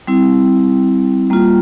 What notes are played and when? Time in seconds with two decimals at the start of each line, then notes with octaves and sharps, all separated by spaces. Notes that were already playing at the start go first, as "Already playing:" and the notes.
0.07 G3 C4 E4
1.30 G3 A#3 F4